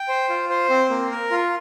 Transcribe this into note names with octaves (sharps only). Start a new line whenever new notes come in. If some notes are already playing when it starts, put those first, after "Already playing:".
Already playing: G5
C5
F4
C5
C4
A#3
A#4
F4